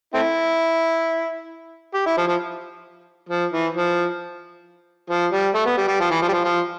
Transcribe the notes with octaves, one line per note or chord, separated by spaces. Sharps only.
A3 C4 E4
G4
E4
F3
F3
F3
E3
F3
F3
G3
A3
B3
G3
G3
F3
E3
F3
G3
F3
F3